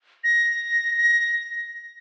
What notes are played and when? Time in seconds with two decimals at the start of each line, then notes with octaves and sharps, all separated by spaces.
0.24 A#6
0.98 A#6